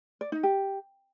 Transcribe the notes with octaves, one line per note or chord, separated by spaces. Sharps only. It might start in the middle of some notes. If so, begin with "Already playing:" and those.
D5
D#4
G4